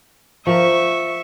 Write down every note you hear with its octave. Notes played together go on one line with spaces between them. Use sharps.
F3 A#4 E5 C#6